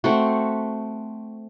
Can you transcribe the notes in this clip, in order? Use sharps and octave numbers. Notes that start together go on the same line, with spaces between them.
A3 C4 F#4